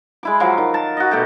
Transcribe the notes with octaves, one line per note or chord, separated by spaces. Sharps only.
G#3 E4 D6
F3 F#3 F5 D6
D#3
A#4 A5
F#4 D#5
B2 A3 G4